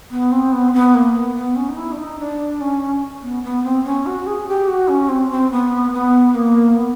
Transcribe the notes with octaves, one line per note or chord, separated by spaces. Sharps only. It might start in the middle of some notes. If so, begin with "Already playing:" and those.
B3
C4
B3
C4
B3
A#3
B3
B3
C#4
D#4
E4
D4
D#4
D4
C#4
B3
B3
C4
C#4
F#4
G#4
G4
F#4
C#4
C4
C4
B3
B3
A#3
B3